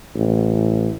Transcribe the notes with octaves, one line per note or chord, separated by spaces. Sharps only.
A1